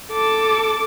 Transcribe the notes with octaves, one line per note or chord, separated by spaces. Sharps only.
A4 D6